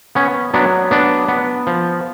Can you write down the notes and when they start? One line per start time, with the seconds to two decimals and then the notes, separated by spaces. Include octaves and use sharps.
0.15 B3 C#4
0.54 F#3 B3 D4
0.91 B3 D4
1.28 B3
1.67 F3